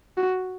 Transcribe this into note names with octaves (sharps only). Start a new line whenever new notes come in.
F#4